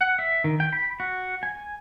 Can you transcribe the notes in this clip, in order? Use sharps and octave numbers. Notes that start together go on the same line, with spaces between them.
F#5
E5
D#3
G5
B5
F#4
G#5